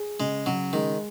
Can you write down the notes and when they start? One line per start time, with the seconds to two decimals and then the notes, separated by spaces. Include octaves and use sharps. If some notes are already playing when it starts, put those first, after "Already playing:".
Already playing: G#4
0.20 C#3 G#3
0.46 C#3 F#3
0.73 D#3 G#3